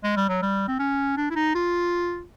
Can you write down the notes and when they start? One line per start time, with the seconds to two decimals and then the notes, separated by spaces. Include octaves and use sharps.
0.04 G#3
0.17 G3
0.29 F#3
0.42 G3
0.68 C4
0.79 C#4
1.17 D4
1.30 E4
1.36 D#4
1.55 F4